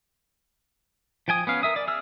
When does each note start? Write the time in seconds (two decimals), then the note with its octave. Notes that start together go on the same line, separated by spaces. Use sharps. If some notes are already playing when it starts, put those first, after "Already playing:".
1.28 F3 G5 G#5 D#6
1.47 B3 C#4 F5
1.63 A#4 E5 D#6
1.76 D5
1.88 G#4 E6 F6